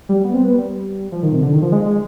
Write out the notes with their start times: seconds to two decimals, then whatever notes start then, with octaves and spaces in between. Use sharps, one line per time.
0.09 G3
0.24 B3
0.33 C4
0.44 B3
0.54 G3
1.12 F3
1.23 D#3
1.32 C3
1.42 D3
1.52 D#3
1.62 F3
1.72 G#3
1.86 G#3